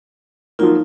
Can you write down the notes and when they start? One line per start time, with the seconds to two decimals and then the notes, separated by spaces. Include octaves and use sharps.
0.59 F3 F#3 A#3 D#4 F4